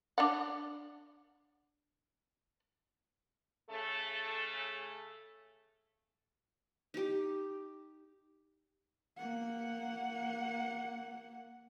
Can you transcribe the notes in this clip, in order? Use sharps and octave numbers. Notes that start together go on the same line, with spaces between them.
D4 D5 F#5
C#3 A3 A4
D#4 G4
A#3 F#5